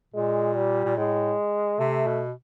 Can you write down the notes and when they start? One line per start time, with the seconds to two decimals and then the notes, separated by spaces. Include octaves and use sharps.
0.14 A#2 G#3
0.56 G3
0.85 A#2
0.97 A2 G#3
1.79 C3 A3
2.07 B2